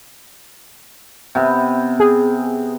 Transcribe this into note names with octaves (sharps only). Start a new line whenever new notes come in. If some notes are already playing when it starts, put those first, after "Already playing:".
C3 B3
G#4